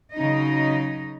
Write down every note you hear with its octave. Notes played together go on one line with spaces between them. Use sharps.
C#3 F#3 D#4 D#5